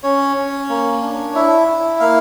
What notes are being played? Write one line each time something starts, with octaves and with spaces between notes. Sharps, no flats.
C#4 C#5
C#4
A#3
D4
E4 E5
E4
A#3 F5